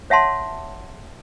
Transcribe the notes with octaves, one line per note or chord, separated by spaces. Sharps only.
C#5 E5 F#5 A5 C6